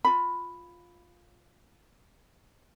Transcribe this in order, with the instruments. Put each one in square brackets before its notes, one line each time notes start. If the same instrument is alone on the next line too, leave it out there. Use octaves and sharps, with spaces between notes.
[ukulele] F4 B5